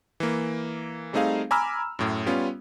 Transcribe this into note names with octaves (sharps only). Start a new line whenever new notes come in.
E3 A#3
G3 A3 C4 D#4 G#4 F5
G#5 A#5 B5 D6 E6 F6
F#2 A2
G3 B3 C#4 F4